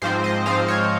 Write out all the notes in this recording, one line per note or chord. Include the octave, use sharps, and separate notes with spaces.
G#2 F3 C4 C5
D#5
G#2 F3 C4 F5
C#5